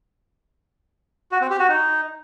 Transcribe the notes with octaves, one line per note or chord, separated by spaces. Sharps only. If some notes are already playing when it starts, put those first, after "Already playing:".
F#4
C4
G4
F#4
D#4